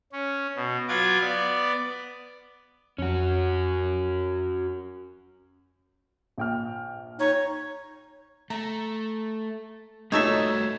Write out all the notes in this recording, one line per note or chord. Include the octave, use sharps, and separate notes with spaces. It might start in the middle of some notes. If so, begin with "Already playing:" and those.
C#4
B2
F#3 F4 B4 D6 G#6
B3 D5
F2 C#4 F#4
A#1 G5 F6
D#4 C#5
A3 A#5
A3 D#4 F4 F#4 A4 C#5 E5